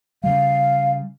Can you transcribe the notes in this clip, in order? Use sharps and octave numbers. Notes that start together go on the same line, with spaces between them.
C#3 G3 F5